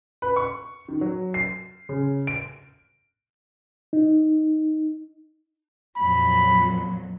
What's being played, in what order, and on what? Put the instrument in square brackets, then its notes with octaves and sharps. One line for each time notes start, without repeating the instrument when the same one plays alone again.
[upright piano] B4
C#6
D#3
F#3
C7
C#3
D7
[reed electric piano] D#4
[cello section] F2 A#2 F#3 [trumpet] B5